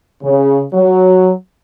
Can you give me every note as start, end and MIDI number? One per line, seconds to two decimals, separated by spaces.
0.23 0.60 49
0.74 1.31 54